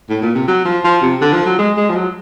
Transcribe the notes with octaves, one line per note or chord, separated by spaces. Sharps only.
A2
A#2
C3
F#3
F3
F3
C3
D3
F3
F#3
G#3
G#3
F3
F#3